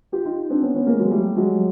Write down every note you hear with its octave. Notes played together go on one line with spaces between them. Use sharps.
F4 G4
D#4 F4
C4 D4
B3 C#4
B3 C#4
G#3 A#3
F#3 G#3
G3 A3
F#3 G#3